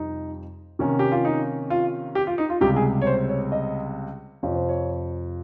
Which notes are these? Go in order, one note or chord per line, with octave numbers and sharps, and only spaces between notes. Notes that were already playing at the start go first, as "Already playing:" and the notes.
Already playing: F2 C3 G3 C4 D#4
C3 D#3 A#3 C#4
G4
F4
D#4
F4
G4
F4
D#4
F4
C#2 C3 G3 G4
G#4
C#5
C5
C#5
D#5
F2 C3 F3 C#5
C5
C#5